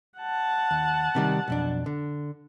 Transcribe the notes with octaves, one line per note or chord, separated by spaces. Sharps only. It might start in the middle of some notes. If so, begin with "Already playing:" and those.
F#5 A5
D#2
C3 D#3 G3
B1 F2 D4
D3